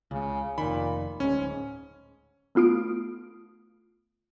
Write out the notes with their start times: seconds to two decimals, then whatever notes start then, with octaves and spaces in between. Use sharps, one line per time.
0.11 C#2 C#3
0.58 F1 A#2 D#3 B5
1.20 D1 G#2 C#4
2.55 A3 B3 F4 D#6 D7